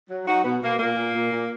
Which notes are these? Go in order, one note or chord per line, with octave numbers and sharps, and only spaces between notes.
F#3
F#3 D#4 F#4
B2 B3
B2 A#3
A#2 A#3
A#2
A#2
A#2